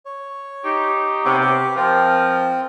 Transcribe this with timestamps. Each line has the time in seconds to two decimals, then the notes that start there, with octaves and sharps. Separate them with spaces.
0.06 C#5
0.64 D#4 G4
1.25 C3 B3 C#5
1.41 G4
1.76 F3 C4 A#4